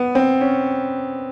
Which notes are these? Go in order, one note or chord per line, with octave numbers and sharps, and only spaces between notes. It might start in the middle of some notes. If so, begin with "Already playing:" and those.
Already playing: B3
C4
C#4